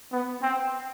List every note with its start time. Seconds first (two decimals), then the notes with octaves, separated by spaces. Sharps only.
0.11 B3
0.42 C4